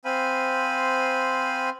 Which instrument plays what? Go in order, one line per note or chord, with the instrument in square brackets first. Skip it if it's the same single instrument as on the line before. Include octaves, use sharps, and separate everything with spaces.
[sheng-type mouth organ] C4 C5 F5 G#5 B5